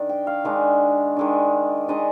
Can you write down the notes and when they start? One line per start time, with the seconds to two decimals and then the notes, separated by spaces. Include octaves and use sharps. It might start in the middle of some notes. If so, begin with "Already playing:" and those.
Already playing: D#3 D4
0.09 G5
0.27 F5
0.45 D#3 G#3 D4
1.17 D#3 G#3 D4
1.88 D#3 G#3 D4 D#5